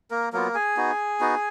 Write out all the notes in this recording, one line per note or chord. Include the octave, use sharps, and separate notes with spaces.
A#3 A#4
F#3 A#3 B3 F4 A#4
G#4 G#5
B3 D#4 F#4
B3 D#4 F#4